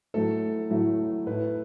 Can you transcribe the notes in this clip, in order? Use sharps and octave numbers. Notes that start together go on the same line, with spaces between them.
A2 F#3 A3 E4 A4
A2 F#3 A3 E4
A2 A3 E4 B4